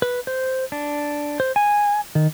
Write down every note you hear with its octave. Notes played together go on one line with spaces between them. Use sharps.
B4
C5
D4
C5
G#5
D#3